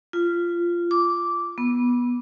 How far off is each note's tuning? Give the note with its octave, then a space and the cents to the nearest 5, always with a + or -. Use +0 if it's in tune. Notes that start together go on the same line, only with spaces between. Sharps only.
F4 -15
D6 -10
B3 -15